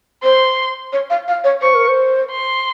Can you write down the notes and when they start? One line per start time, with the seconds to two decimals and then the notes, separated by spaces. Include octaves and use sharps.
0.23 C5 C6
0.93 C#5
1.10 F5
1.28 F5
1.44 C#5
1.62 C5 C#6
1.75 A#4
1.88 C5
2.31 C6